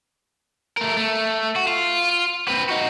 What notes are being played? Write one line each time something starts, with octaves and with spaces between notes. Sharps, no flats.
A3 A#4
A3
F#4
F4
C4 B4
D#4 F#4